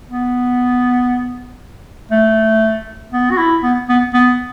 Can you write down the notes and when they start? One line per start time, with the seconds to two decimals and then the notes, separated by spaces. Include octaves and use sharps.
0.09 B3
2.11 A3
3.13 B3
3.31 F#4
3.38 E4
3.63 B3
3.89 B3
4.14 B3